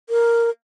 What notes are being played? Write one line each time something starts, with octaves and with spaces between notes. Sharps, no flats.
A#4